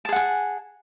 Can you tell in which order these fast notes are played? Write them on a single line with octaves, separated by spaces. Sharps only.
A5 G#4 F#5 G#5